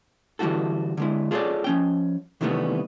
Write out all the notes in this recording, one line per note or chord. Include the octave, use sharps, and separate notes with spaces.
D3 E3 G3 E4 F#4 A4
D3 G#3 E4
F4 G#4 A4 B4 C#5 D5
F3 C#4 G5
C3 D#3 E3 G3 A3 B3